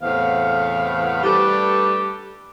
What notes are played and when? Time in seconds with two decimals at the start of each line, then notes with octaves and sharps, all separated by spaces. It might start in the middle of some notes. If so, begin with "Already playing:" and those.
0.01 E2 A2 C3 B3 F5
1.23 G3 A3 D4 G4 A4 B4